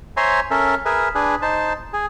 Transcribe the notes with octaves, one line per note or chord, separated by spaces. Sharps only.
C5 C#5 E5 G#5 A#5 C6
C#4 A4 A#4 E5
G#4 A#4 B4 E5
D4 G#4 B4
D#4 C5 A5
G#4